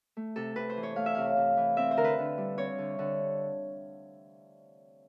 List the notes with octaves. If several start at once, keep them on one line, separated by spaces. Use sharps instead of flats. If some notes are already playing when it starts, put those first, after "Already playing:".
A3
C3 A4
C3 B4
C5
E3
C#5
A3 F5
E5
C3 F5
C3
E3
C4 E5
C5
D3 A#4
B4
D3
G3
C4 C#5
D3
D3